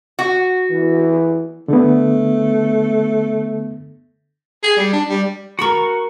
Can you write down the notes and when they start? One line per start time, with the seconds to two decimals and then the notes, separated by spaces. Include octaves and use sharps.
0.19 F#4
0.70 E3
1.68 D3 A3 B3
4.63 G#4
4.77 G3
4.93 D4
5.09 G3
5.59 F#4 A#4 A5 B5 C#6